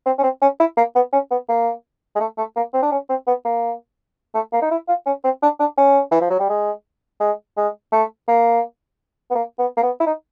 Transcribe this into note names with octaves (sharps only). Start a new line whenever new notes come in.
C4
C#4
C4
C#4
E4
A#3
B3
C#4
B3
A#3
G#3
A3
A3
A#3
C4
D4
C#4
C4
B3
A#3
A3
A#3
D#4
E4
F4
C#4
C4
D4
D4
C#4
E3
F3
F#3
G3
G#3
G#3
G#3
A3
A#3
B3
A#3
B3
A#3
B3
E4
D#4